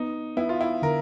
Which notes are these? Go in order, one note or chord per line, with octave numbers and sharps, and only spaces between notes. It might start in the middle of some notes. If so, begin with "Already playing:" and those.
Already playing: B3 D#4
B3 E4
F4
E4
D3 A#4